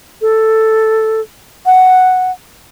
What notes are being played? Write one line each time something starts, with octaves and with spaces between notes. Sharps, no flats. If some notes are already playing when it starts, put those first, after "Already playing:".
A4
F#5